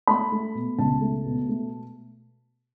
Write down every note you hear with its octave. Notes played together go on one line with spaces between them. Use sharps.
A3 B5
A3
B2
C#2 A5
A3
B2
A3